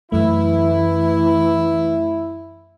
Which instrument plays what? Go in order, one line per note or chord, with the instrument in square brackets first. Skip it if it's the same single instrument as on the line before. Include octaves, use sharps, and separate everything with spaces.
[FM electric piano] F#2 A3 [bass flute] E3 [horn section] E4